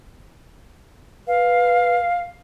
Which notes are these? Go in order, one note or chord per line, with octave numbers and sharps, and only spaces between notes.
B4 F5